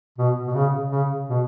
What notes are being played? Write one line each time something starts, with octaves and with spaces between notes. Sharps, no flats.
B2
B2
C#3
C#3
B2